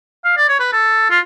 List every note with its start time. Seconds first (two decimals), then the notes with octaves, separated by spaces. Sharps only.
0.25 F5
0.37 D5
0.48 C#5
0.60 B4
0.72 A4
1.10 F4